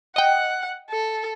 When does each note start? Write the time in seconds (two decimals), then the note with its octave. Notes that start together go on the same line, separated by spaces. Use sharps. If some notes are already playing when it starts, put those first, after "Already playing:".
0.16 D#5 F#5 G5
0.90 A4